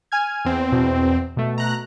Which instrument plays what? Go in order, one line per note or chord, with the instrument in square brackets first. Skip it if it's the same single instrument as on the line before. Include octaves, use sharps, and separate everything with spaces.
[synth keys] G#5 F6 G#6
[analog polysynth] E2 C4
[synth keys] B2
B2 A3
[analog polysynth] A#5 F#6